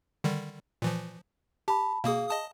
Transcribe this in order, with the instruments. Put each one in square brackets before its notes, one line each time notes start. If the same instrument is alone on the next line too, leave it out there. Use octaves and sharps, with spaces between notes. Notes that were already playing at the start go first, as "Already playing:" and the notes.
[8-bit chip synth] D3 D#3 G3
A#2 E3 F3
[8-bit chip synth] G4 [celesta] A5 B5
[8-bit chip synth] B2 A#3 D#6 [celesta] G#4 F5
[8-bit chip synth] D#5 A5 D#6